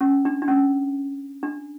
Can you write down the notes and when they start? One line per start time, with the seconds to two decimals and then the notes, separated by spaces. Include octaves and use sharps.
0.01 C#4
0.25 D4
0.42 D4
0.48 C#4
1.43 D4